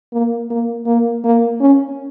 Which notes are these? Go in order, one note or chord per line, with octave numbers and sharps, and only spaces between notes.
A#3
A#3
A#3
A#3
C#4